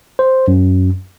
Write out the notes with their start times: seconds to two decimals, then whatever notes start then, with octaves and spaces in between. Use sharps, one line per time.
0.19 C5
0.48 F#2